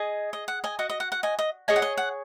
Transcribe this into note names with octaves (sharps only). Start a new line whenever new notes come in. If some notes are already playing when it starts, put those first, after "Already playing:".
Already playing: G#4 D#5
D#5
F#5
D#5 G#5
F#4 D#5 F#5
D#5
F#5
F#5
D#5 G#5
D#5
G#4 C#5 D#5 G#5
F#5
D#5
F#5